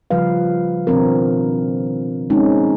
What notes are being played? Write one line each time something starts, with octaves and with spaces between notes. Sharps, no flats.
C#3 F3 G3 B4 F5
B2 D#3 F3 C4 D4 A#4
G#3 C4 C#4 D#4